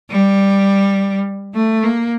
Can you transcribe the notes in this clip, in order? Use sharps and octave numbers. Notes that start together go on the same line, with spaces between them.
G3
A3
A#3